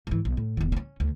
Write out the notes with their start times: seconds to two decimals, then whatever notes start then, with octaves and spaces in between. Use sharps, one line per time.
0.07 G#2 E3
0.25 B1
0.37 A2
0.57 E1 D#3
0.72 C#4 D4
1.00 D2